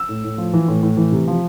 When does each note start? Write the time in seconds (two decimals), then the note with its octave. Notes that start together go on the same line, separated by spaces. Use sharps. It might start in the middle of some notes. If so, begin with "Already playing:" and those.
Already playing: E6
0.09 A2
0.24 A2
0.38 F3
0.54 E3
0.68 A2
0.83 A2
0.97 E3
1.12 C3
1.28 F3